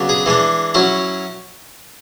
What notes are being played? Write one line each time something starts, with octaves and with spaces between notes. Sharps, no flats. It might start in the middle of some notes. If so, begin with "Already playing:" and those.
Already playing: C#3 F#3 B3 D4
G#4
E3 G#3 D4
F#3 C#4 E4